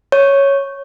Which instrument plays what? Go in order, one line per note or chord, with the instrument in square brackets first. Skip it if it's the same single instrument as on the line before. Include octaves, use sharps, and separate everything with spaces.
[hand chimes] C#5